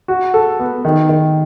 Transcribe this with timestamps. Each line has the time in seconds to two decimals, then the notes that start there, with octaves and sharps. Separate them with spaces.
0.08 F#4
0.34 A4
0.59 B3
0.85 D#3
1.09 D#3